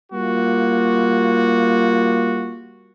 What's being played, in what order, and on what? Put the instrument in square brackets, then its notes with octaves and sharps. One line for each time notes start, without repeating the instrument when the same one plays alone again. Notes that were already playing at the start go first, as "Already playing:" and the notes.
[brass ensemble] G3 A#3 F4 F#4